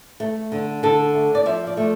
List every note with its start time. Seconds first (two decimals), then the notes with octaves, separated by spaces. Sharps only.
0.20 A3
0.52 D3
0.83 D3 A4
1.14 A3
1.35 D5
1.46 F3 E5
1.67 D5
1.77 A3